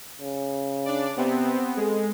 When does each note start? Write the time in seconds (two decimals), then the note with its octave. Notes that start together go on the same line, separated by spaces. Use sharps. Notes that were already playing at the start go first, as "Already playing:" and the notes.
0.21 C#3
0.86 D4 D5
1.17 C3 B3 C4
1.77 G#3 A4